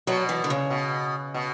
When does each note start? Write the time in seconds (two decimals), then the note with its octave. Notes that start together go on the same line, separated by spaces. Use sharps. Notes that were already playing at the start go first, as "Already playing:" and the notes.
0.07 B2 F#3
0.29 E3
0.44 D3
0.50 C#3
0.70 B2
1.34 B2